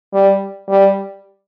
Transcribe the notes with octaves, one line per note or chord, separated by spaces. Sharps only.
G3
G3